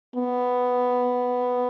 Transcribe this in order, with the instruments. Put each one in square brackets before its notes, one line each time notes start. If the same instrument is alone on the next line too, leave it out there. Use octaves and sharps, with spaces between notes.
[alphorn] B3